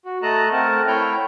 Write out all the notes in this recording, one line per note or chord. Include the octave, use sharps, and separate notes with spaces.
F#4
A3 A4 D#5 A5 A#5 F#6
A3 C4 A#4 F#5 A5
A3 E4 C#5 G5 F6 G6